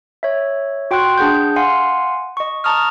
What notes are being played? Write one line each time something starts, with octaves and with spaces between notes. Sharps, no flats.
C#5 E5
F#4 G5 C6 C#6 F#6
D4 G#4 F#5 G6
F5 F#5 G#5 C6
D#5 C#6
A5 A#5 C#6 D#6 F6